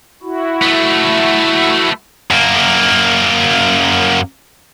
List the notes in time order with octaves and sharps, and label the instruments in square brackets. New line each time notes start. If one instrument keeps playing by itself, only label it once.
[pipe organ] E4 F#4
[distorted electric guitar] A3 B3
F#2 A#3